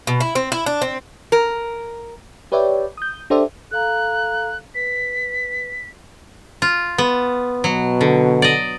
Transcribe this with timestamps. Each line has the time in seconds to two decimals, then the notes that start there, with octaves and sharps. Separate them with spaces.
0.07 B2
0.21 E4
0.35 C4
0.52 E4
0.66 D4
0.82 C4
1.32 A#4
2.52 G4 B4 C#5 D5 E5 G5
2.97 D#6 G6
3.30 D4 G4 A4 C5 D5 E5
3.71 A4 F5 A#5 F#6
4.75 B4 B6
6.62 F4
6.98 B3
7.64 B2 F#3
8.01 D3
8.42 D5 D#5